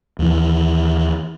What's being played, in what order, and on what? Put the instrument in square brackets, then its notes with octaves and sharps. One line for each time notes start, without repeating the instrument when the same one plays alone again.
[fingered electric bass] D#2 E3